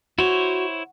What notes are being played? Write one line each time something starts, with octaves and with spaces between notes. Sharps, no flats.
E4 F#4 C5 C#5